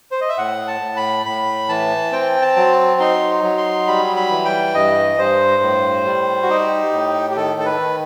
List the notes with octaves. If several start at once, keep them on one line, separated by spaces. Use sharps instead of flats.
C5
D#5
E5
A2 F#5
A5
A2
B5
A2 B5
E3 A5
C4 G5
A5
F#3
D#4 C6
F#3
C6
G3 B5
B5
E3
G5
G2 D#5
G2 C5
A2
G3
F#4
D#4 G4
A2
G4
D#3 A4
A4
B4
D#3